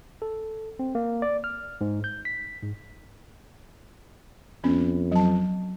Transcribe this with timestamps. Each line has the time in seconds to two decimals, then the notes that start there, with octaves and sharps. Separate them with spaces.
0.22 A4
0.79 C4
0.95 A#3
1.22 D5
1.44 F6
1.81 G#2
2.04 G6
2.25 B6
2.62 G#2
4.64 F2 B3 C#4
5.12 F#3 A5